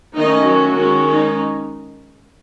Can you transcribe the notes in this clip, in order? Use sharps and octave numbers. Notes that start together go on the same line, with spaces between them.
D#3 A3 C#4 D#4 D#5
F#3 F#4
D#3 G#3 C#4
D#4